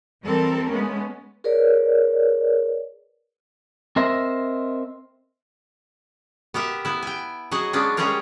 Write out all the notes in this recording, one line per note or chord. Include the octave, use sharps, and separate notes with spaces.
E3 G3 C4 A4 A#4
G#3 A3 B3 C#4
G#4 A#4 B4 C#5 D5
C4 A#4 C5 D#5 E5
B3 G4 A#4 E5
B3 E4
G5 G#5
F#3 F#4 G#4 D#5
G#3 B3 C#4 D4
G3 G#3 C#4 G#4 A#4 C#5